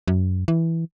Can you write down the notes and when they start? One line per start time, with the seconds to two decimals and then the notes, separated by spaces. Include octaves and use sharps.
0.08 F#2
0.48 E3